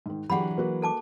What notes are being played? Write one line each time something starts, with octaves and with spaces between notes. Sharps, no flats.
G#2 D#3
D3 E3 F#3 D4 G4 G#4 F#5 B5
A#3 F#4 B4
A4 A5 D6